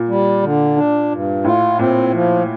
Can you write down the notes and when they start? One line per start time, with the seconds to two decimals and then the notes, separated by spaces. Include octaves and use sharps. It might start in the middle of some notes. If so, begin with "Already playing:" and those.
Already playing: A#2
0.08 G3
0.42 D3
0.77 D4
1.11 G2
1.45 A2 F4
1.79 A#2 C4
2.13 F3